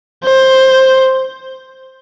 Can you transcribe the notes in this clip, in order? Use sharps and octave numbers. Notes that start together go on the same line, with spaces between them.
C5